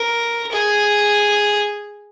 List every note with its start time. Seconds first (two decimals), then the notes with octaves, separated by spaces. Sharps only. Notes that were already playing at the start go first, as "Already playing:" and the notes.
Already playing: A#4
0.52 G#4